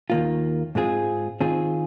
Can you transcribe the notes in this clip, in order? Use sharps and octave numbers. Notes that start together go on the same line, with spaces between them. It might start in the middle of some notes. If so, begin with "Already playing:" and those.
D#2 D#3 A#3 F4
G#2 G#3 C4 F4 G#4
D#3 C4 F4 G#4